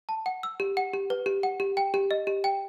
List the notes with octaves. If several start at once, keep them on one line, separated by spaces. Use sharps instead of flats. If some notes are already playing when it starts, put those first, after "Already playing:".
A5
F#5
E6
G4
F#5
G4
B4
G4
F#5
G4
G5
G4
D#5
G4
G5